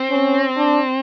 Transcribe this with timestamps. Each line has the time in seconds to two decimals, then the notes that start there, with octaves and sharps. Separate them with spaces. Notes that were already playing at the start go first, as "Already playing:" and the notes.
Already playing: C4
0.11 C#4
0.57 D4